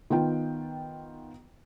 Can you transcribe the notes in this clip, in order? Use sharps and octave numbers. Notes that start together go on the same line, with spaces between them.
D#3 B3 F4 G5